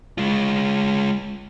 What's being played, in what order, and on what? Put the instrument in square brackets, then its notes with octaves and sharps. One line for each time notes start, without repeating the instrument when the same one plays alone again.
[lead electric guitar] G#3 F4